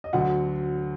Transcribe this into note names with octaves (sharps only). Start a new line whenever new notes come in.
D#5
D2 D3 F#3 F#5